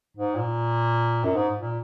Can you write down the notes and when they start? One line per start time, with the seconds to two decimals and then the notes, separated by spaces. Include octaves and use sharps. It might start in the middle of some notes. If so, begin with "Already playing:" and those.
0.17 G#2
0.35 A#2
1.24 F#2
1.35 G#2
1.60 A#2